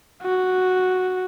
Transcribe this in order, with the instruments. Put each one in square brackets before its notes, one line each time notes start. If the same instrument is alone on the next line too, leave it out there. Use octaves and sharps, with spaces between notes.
[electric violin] F#4